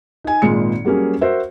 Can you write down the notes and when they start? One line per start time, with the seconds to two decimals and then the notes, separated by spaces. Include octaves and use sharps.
0.24 D#4 G#5
0.42 G#1 A#2 G#3 C#7
0.85 F#3 G3 A#3 C#4 G#4
1.21 F#4 A#4 C5 E5